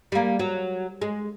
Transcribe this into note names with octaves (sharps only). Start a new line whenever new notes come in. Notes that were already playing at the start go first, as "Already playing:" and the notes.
G3 A#3
F#3
G#3